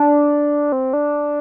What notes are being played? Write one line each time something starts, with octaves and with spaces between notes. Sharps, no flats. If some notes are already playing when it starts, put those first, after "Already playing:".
Already playing: D4
C4
D4